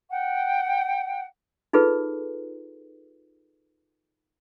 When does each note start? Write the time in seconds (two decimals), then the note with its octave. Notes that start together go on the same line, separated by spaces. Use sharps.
0.10 F#5 G5
1.73 D#4 F4 G#4 A4 B4